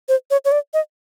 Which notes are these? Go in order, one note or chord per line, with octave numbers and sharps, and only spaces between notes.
C5
C#5
C#5
D5
D#5